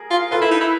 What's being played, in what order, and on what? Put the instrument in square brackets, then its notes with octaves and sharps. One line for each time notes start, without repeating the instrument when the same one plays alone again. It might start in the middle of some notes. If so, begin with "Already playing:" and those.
Already playing: [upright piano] G#4 A#4
[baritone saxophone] F4
[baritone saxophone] F4 [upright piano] A4 B4
[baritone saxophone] E4
D#4
E4